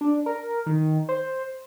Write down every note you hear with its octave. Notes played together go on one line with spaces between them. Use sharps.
D4
A#4
D#3
C5